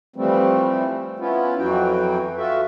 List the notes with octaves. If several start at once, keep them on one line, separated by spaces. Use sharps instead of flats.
E3 F3 G3 A3 C4
B3 C#4 E4 F4
F2 E3 F#3 F#4 G5
F4 F#4 A4 E5